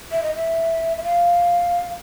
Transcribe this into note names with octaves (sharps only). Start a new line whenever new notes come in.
E5
D#5
E5
E5
F5